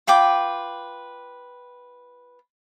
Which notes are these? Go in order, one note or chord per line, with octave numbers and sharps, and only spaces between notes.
F4 B4 G5 D6